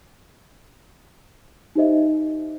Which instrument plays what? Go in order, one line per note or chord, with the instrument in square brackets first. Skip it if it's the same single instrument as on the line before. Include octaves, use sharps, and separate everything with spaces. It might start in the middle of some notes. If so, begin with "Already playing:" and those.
[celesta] D#4 G4 C5 D#5 E5